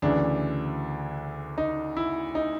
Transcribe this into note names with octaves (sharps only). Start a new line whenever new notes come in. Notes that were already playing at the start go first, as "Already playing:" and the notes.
D2 C#3 E3 D4
D#4
E4
D#4